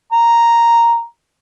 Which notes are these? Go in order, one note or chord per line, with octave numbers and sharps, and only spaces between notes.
A#5